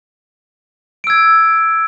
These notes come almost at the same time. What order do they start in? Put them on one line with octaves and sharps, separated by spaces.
D7 E6 G#6